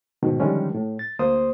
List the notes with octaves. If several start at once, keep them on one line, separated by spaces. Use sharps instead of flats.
D2 G#2 B2 D#3
D3 D#3 F3 G3 G#3 C#4
A2
A6
D2 A#3 C5 C6 D#6